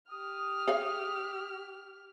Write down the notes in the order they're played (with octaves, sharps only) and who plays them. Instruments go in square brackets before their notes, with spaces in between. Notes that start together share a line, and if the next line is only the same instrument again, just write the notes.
[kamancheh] G4 F6 [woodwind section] D#6
[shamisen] G#4 C#5 F5